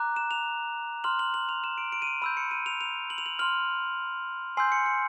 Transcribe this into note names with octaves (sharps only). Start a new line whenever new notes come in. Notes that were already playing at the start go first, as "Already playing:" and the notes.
Already playing: A#5 D6 F#6
E7
F7
C6 F6 F#7
F#7
F#7
F7
E7
D7
D7
D#7
D7
B5 E6 G6 D#7
C#7
D#7
F7
F7
F#7
F7
F#7
C6 F6 F#7
G#5 C6 E6 G6 C7
C#7
C#7